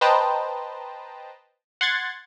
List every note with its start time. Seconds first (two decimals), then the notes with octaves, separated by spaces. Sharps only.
0.01 B4 C5 D#5 G5 A5 A#5
1.81 F#5 C6 G#6 A6